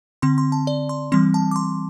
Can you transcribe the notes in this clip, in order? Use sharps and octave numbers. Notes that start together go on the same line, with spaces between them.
D3 C4 C6
C6
A5
D5
C6
E3 G3 C4 C6
A5
D6
C6